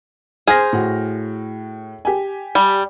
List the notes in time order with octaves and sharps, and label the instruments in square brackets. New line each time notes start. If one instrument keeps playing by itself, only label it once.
[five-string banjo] G#4 C5 [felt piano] F6 A#6
[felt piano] A2 F#4
G4 G#5
[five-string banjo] G3